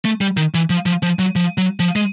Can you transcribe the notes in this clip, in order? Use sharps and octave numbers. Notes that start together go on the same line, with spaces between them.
A3
G3
D#3
E3
F3
F3
F3
F#3
F3
F#3
F3
G#3